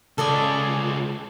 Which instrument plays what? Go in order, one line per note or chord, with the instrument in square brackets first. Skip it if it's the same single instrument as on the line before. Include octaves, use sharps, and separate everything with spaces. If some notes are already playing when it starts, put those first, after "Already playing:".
[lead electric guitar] C#2 G#4 [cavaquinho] A4 D5 D#5